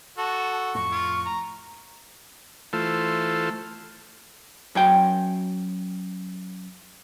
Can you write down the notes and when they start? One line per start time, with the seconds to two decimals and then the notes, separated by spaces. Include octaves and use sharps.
0.18 F#4 A4 A5
0.75 F2 A2 C#6
0.92 F4
1.25 A#5
2.73 E3 A3 F4 A4 C5
4.75 F#2 C#5 G5